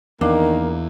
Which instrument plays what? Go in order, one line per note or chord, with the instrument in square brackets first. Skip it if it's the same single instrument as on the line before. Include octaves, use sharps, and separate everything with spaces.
[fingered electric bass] E2 [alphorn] D#3 [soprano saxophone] A#3 [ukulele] D4